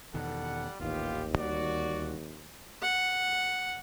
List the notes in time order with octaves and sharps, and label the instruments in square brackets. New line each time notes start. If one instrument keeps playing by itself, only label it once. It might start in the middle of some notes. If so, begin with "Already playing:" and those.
[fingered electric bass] E2 B2 D#3 [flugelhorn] G3 [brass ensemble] A4 F#5
[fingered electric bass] D#1 A1 D#3 [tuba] D#2 [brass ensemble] B3 G4 [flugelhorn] F4
[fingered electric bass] D2 D#3 G3 [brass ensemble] F#4 [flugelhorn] D5
[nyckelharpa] F#5